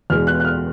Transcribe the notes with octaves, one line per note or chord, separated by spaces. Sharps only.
E2 B2 G#3 F6
F#6
F#6
F6